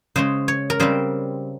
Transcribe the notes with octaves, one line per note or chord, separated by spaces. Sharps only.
C#3 G#3 C#4 C5
C#5
A#4
C#3 G3 C4 C5